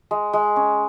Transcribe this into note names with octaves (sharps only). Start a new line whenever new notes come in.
G#3
G#3
C#4